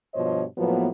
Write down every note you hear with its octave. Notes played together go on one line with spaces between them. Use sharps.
G2 B2 F3 C5 C#5 D#5
A2 F3 F#3 A#3 B3